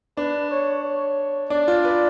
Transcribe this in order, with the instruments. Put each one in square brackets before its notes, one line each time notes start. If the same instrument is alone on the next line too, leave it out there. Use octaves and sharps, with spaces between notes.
[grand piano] D4 [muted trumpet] B4
[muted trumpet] C#5
C#5
[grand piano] D4 [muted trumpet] D5
[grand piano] F4
B4